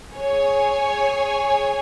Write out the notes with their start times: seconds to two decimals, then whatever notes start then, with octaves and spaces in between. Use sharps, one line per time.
0.14 G#4 C#5 G#5